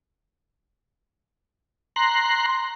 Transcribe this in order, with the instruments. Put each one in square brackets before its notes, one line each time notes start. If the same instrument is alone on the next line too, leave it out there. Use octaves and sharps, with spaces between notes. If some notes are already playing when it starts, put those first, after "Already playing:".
[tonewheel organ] A#5 C6 F#6